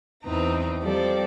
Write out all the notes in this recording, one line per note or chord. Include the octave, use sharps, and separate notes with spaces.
E2 C4 D#4 B4 A#5
F3 G3 C4 G4 A4 D5